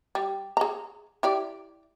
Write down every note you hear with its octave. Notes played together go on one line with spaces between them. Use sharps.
G3
G#4 A#5
E4 G4 D5